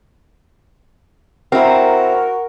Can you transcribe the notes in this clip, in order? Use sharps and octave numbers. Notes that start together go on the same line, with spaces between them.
C4 E4 F#4 A#4